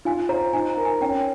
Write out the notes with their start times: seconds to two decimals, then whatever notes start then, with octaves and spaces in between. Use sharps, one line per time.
0.05 F4 G#5
0.29 C5 A#5
0.53 D#4 G#5
0.70 A#5
0.77 A#4
0.85 G#5
1.01 C#4 G5